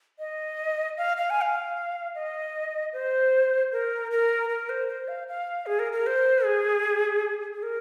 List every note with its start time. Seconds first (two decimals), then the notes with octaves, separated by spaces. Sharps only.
0.19 D#5
0.97 F5
1.17 F5
1.30 G#5
1.42 F5
2.15 D#5
2.93 C5
3.72 A#4
4.11 A#4
4.49 A#4
4.69 C5
4.88 C5
5.08 F5
5.28 F5
5.66 G#4
5.79 A#4
5.93 A#4
6.07 C5
6.45 G#4
7.54 G#4
7.63 A#4